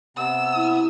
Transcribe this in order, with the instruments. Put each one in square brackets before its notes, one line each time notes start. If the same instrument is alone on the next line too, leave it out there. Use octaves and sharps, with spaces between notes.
[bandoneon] C3 B3 [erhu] E6
[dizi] E4